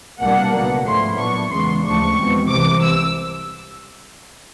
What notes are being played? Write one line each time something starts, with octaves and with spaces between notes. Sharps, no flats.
C2 B2 G3 A#3 D4 F#5
C#2 B2 F#3
G#2 F3 A3 C#4 E4 C6
A#2 F#3 B3 D4 C#6
E2 C#3 E3 G#3 B3 C6
D2 C#3 F3 A3 D4 C#6
E2 B2 G#3 C4
C2 C3 E3 D6
E6